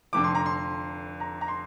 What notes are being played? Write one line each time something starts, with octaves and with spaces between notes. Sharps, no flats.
F1 F2 D3 D6
C6
A#5
C6
A#5
A#5
C6